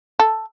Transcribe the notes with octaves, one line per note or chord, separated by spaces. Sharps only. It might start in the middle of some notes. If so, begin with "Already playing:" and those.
A4